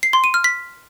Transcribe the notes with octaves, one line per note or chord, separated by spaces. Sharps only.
C7
C6
D#7
F6
B6